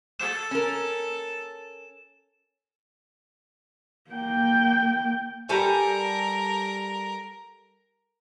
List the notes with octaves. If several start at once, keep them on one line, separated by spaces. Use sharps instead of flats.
A4 E7
C#4 A#4
A#3 G5
G3 A4 A#4 G#5